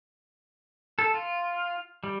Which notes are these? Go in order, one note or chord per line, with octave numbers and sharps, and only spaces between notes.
A4
F4
G3